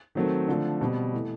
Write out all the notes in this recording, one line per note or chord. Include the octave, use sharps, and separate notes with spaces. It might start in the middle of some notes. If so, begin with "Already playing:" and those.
D#3 F#3 A3 C4
D3 F3 A3
B2 G3 C4
E3 A3